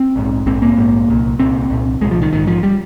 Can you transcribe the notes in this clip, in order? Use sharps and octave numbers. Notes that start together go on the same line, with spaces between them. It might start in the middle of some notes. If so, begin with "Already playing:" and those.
Already playing: C4
A#1 G#2
A#1 G#2 C4
A#3
A#1 G#2
C2 A#2
C2 A#2 C4
C2 A#2
C2 A#2 G#3
F3
D#3
A#1 G#2 D#3
F3
G3